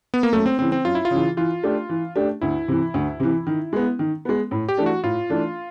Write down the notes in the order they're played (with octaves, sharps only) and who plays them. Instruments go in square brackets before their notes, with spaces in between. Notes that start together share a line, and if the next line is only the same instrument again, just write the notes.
[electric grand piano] B3
A#3
[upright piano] F#2 [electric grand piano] A3
[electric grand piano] C4
[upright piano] C#3 E3 [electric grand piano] C4
[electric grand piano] C4
[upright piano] F#2 [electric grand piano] F4
[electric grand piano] E4
F4
[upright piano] C#3 E3
[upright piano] E3 [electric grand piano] F4
[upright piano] A3 D4 G4
E3
A3 D4 G4
[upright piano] D2 [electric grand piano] E4
[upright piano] C3 E3
D2
C3 E3
D#3
G#3 B3
D#3
G#3 B3
A2
[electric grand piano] G4
[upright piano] E3 A3 D4
[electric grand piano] F#4
[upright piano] A2 [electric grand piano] F4
[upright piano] E3 A3 D4